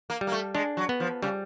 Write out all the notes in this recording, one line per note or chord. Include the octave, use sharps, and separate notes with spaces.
A#3
G3
A#3
A3
G#3 D4
F#3
B3
F3
C#3 G3